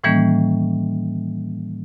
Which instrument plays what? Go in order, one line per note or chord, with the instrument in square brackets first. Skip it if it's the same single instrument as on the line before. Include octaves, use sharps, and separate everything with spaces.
[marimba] A2 D#3 E3 G3 A#3 C#4